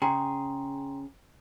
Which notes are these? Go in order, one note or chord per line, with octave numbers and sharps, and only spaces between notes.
C#3 G#4 G5 A#5 C6